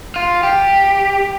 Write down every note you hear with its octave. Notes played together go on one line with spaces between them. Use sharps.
F4
G4